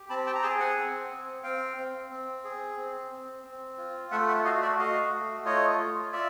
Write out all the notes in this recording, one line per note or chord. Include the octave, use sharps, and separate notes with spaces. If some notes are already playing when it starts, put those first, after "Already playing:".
Already playing: G4
C4 A5 B5
G5 A5
A#5
G#4 G5 A5
F#5 G#5
C4
C4
C4 F5 G5
C4
C4
G#4
C4
C4
C4
F4
A3 E5 F#5
E5 F#5
F#4 D#5 F5
D5 E5
F#4 D#5 F5
A3
F4 C#5 D#5
F4
F4 D5 E5